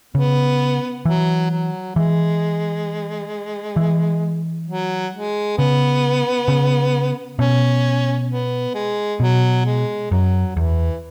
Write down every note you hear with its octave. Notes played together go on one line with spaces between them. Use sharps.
C#3 B3
E3 F#3
F#3
E3 G#3
E3
F#3
G#3
C#3 B3
C#3
B2 C#4
B3
G#3
B2 F#3
G#3
F#2 F#3
E2 E3